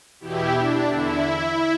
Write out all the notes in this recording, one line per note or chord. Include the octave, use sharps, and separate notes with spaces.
E2 B2 E4 G4
D4
E2 D3 E4